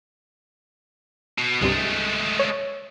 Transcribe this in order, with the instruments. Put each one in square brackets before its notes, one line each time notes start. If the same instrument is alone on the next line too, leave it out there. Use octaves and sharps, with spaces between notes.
[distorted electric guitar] B2
[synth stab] C2 G2 C3 [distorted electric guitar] G#3 A3
[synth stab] C#5